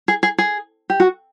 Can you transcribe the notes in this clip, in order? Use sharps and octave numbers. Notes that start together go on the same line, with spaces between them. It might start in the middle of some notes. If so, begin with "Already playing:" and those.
G#4
G#4
G#4
G4
F#4